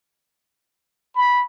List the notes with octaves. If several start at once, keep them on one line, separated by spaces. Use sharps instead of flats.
B5